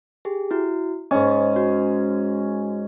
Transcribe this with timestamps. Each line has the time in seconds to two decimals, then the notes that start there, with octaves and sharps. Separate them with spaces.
0.25 G4 G#4
0.51 E4 F#4
1.11 G#2 C#4 D#5
1.56 F#4